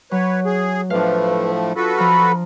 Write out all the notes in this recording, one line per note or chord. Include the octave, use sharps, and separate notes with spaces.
F#3 B4 C#5
G#4
A2 F3 A3 D4 B4 F5
F4 F#4 A4 B4
F3 A#5 B5 F6